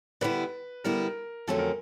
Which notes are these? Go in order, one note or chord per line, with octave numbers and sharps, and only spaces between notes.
D3 G3 B3 E4 B4
D3 G3 B3 E4 A#4
F2 D3 F#3 A3 C#4 A4
A#4